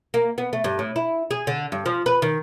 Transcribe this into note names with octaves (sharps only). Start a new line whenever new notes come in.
A#3
B3
A3
G2
A2
E4
G#4
D3
G2
F3
B4
D#3